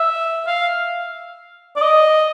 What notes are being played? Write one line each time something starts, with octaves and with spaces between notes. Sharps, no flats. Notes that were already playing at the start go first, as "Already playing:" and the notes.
Already playing: E5
F5
D5
D#5